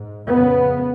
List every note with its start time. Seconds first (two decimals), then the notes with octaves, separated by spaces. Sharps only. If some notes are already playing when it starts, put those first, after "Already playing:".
Already playing: G#2
0.27 F2 C#3 B3